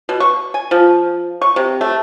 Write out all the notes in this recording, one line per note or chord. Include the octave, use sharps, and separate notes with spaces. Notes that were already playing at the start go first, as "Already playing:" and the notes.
B2
C#6
G#5
F3
C#6
C3
A3